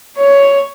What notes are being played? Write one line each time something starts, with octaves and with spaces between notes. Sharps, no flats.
C#5